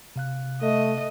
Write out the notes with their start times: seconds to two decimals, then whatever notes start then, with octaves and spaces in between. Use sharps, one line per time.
0.16 C3 F5 F#6
0.62 A3 D#5